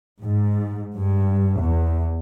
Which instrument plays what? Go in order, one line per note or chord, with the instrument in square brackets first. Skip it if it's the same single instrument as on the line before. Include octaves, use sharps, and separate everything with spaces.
[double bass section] G#2
G2
E2